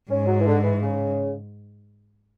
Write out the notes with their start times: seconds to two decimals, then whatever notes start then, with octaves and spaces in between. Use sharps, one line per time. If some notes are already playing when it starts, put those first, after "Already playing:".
0.10 G#2 C#4
0.27 F#3
0.40 E3
0.46 D3
0.64 E3
0.82 C#3